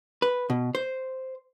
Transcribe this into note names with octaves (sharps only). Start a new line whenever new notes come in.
B4
B2
C5